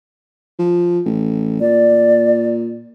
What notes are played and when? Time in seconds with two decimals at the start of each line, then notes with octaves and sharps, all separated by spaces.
0.59 F3
1.05 A1
1.61 A#2 D5